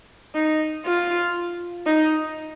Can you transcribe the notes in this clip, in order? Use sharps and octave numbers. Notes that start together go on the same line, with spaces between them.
D#4
F4
D#4